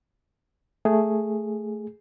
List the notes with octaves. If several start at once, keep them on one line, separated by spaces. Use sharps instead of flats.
A3 G#4